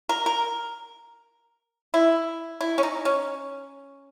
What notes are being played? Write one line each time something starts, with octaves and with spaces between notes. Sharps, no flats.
A#4
A#4
E4
E4
C#4
D#4
C#4